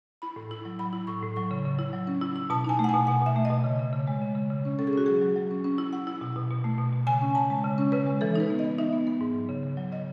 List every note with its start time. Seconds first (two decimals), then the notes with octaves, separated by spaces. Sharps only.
0.22 E4 B5
0.36 A2
0.51 E4
0.65 F#3
0.79 F#3 B5
0.93 E4
1.07 A2 C#6
1.22 A2
1.36 F#3 C#6
1.51 C#3
1.65 C#3
1.79 E4
1.93 F#3
2.07 C#4
2.21 E4
2.36 E4
2.50 B2 A5
2.64 D#4 G#5
2.79 A3
2.84 F#5
2.89 B2 G#5
3.07 B2 F#5
3.22 B2 E5
3.36 A3
3.45 D#5
3.50 B2
3.64 C#3
3.79 C#3
3.93 C#3
4.07 G#3
4.21 C#3
4.35 C#3
4.51 C#3
4.65 C#4
4.79 C#4 A4
4.87 G#4
4.93 C#4 F#4
5.06 F#3 G#4
5.21 F#3
5.36 F#3
5.51 C#4
5.64 C#4
5.78 E4
5.93 E4 F#5
6.07 E4
6.21 B2
6.36 B2
6.50 B2
6.64 A3
6.78 B2
6.93 B2
7.07 C#3 G#5
7.21 C#4
7.35 C#3 A5
7.50 G#3
7.64 C#3
7.78 C#4
7.92 C#3 B4
8.07 G#3
8.21 E3 A4
8.35 D#4 B4
8.50 B3
8.59 D#5
8.64 B3
8.78 D#4 E5
8.93 B3
9.07 B3
9.21 G#2
9.35 F#3
9.49 C#3
9.64 C#3
9.77 F#3
9.92 C#3 D#5